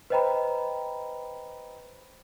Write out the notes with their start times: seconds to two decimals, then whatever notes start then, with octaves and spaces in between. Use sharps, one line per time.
0.10 B4 C5 D#5 G5 A#5 B5